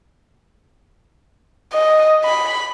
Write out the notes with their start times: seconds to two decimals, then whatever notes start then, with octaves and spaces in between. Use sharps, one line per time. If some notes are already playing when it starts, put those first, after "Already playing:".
1.73 D#5
2.24 B5